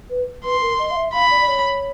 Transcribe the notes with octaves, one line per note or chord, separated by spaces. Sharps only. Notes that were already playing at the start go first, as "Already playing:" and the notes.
B4
B4 C6
A#4
D#5
F5
E5
F5 B5
D5
D5
C#5